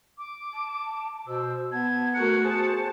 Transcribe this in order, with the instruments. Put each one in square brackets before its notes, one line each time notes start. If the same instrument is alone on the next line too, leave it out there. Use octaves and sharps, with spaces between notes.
[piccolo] D6
[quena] A5
[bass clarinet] B2 [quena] C5 [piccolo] E6
[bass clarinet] B3 [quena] A5 [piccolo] G#6
[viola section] A3 F#4 A#4 [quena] F#6 [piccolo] C#7
[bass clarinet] G#4 [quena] C5 [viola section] A5